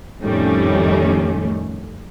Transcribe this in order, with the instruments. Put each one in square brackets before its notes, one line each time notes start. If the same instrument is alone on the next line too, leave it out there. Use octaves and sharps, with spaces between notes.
[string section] F2 A2 D#3 G3 A3 C#4